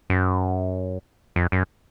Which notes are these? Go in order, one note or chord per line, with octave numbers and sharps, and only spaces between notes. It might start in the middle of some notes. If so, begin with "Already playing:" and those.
F#2
F2
F#2